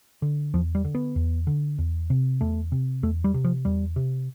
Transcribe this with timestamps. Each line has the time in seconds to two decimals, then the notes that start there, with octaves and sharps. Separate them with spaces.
0.22 D3
0.54 E2 F3
0.75 G3
0.85 D3
0.95 B3
1.16 E2
1.47 D3
1.78 E2
2.10 C3
2.41 E2 A3
2.72 C3
3.03 E2 A3
3.24 G3
3.34 C3
3.44 F3
3.65 E2 G3
3.96 C3